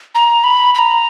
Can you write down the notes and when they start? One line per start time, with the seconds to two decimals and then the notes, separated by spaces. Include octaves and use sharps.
0.15 A#5
0.44 B5
0.75 B5
0.78 A#5